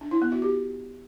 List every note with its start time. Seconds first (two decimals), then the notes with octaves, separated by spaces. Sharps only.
0.01 D4
0.11 E4
0.22 B3
0.32 F#4
0.42 G4